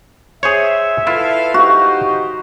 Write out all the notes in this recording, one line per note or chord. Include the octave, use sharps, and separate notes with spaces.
G#4 C5 C#5 E5
E4 F4 A4 B4 F5
D#4 F#4 G4 C5